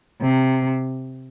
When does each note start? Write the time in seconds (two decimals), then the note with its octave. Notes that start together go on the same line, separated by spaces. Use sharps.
0.21 C3